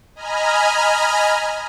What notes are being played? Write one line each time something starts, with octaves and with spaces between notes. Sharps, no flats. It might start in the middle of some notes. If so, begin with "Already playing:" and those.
D#5 G#5 A#5 B5 F6